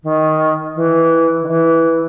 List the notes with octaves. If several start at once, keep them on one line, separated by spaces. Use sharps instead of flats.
D#3
E3
D#3
E3